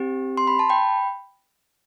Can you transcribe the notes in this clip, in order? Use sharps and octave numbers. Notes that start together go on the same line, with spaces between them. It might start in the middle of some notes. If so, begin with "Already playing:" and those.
Already playing: C4 G4
C6
B5
A5
G5 B5